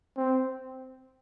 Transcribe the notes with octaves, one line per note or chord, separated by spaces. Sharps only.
C4